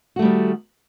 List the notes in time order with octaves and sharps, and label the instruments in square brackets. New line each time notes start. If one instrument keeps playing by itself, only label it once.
[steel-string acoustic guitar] F#4
A3
G3
D#3